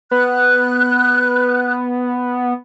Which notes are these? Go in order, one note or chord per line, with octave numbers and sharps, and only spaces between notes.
B3 F#6